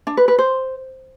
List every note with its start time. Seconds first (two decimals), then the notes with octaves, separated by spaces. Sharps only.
0.07 D4
0.17 B4
0.28 B4
0.39 C5